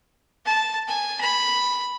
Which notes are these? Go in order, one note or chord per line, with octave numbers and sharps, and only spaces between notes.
A5
G#5
B5